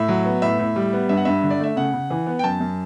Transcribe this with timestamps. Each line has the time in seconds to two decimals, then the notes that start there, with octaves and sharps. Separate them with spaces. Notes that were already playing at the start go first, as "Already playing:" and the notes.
Already playing: A2 E5
0.08 F#3
0.25 B3
0.42 A2 E5
0.59 A2
0.76 G3
0.93 B3
1.09 G2 E5
1.17 F#5
1.25 G2 E5
1.43 D3
1.50 D5
1.59 A3 E5
1.76 C#3 F#5
1.94 C#3
2.10 E3
2.27 B3
2.39 G5
2.44 F#2 A5
2.60 F#2